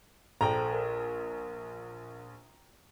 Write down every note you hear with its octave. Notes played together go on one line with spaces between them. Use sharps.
A#1 A4 C5 G5 A#5
A#4